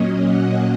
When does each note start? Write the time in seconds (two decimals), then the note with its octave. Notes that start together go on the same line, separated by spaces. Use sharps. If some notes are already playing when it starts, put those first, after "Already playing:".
Already playing: A#2 F#3 A#3 C#4 D#5
0.24 F#5